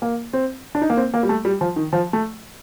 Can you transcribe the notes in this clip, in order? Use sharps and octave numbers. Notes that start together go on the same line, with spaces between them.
A#3
C4
D4
D#4
A#3
C4
A#3
G3
A3
G3
F3
D#3
F3
A3